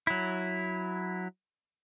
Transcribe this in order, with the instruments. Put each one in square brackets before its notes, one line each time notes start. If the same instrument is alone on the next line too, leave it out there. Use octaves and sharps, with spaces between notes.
[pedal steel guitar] F#3 E4